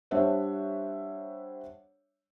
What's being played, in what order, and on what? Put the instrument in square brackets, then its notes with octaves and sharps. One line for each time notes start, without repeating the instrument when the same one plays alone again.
[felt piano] G3 D4 C5 C#5 E5 F#5